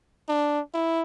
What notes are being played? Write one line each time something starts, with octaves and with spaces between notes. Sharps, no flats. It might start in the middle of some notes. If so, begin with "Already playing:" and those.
D4
E4